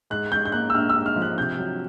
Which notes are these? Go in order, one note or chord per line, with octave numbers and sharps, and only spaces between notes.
G#2 F#6
G#2 G6
G6
A#3 F#6
E6
A#1 F6
E6
G#2
F6
F3
F#6
C3 G6
F#3